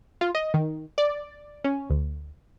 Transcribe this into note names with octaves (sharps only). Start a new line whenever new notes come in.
F4
D#5
D#3
D5
C#4
D2